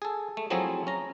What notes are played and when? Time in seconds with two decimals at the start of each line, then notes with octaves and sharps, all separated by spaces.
0.02 G#4 A4
0.37 A3
0.50 F3 F#3 A3 C4 E4 G#4
0.87 C#4 A#5